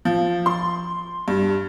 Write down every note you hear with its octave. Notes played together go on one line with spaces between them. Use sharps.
F3
C6
G2